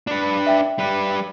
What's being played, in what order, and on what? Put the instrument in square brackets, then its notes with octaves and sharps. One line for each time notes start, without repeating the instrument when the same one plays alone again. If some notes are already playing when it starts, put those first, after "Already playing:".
[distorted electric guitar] D4 B4
[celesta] E5 G5
[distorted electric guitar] G3 B4